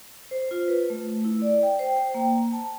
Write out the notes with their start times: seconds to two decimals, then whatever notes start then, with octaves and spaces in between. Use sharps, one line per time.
0.31 C5
0.51 F4
0.68 B4
0.90 A3
1.25 E4
1.42 D5
1.63 G5
1.79 C5
1.96 G5
2.15 A#3
2.53 A5